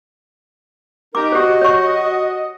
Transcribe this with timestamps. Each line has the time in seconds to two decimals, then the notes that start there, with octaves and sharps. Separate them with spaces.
1.15 D#4 G4 A#4 D6
1.32 F#4 G4 C5 D#5
1.62 C#5 C#6